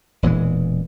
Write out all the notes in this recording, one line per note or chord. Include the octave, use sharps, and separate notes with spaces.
E1 A#2 E3 G#3